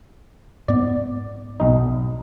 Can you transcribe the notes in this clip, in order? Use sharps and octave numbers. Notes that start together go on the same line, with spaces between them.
G#2 B3 D5
B1 D#4